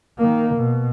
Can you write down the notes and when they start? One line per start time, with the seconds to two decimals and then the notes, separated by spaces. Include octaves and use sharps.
0.18 D#3 A#3
0.55 B2